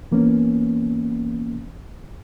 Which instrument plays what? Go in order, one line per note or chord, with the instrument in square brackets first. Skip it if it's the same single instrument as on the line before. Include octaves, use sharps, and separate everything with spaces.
[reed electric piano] E3 A#3 B3 C#4